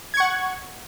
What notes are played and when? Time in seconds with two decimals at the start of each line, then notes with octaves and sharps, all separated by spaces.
0.14 G#6
0.17 C#6
0.20 F#5